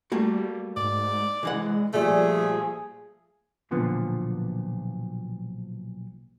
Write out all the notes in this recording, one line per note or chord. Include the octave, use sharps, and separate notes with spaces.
G3 A3 A#3 F#4
G#2 D5
C2 E3 G#3 F#5
A#2 F3 G3 A3 G#4
B1 A#2 D3 F3 B3